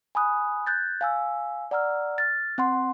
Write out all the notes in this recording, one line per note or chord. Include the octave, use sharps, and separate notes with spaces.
G#5 B5 D#6 F#6
F#6 G6 A6
F5 G#5 E6
D5 F#5 A#5 E6 F6
F6 A6
C4 F#5 C6